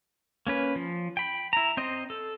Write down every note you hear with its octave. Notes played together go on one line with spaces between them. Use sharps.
A#3 C#4 B4
F3
G5 B5
E4 A#5
C4 C5 D#5
A4